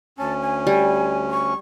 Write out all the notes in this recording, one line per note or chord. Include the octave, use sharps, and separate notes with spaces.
D2 C#4 A5
G#5
G3 G#5
C#6